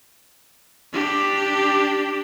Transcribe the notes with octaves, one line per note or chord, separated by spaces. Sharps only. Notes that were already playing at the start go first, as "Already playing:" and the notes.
D4 G4